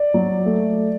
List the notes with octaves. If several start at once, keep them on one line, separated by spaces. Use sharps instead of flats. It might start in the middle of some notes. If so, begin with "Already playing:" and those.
Already playing: D5
F#3
A3